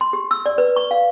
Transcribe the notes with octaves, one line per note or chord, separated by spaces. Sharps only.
C6
G4
E6
D5
B4
C#6
F5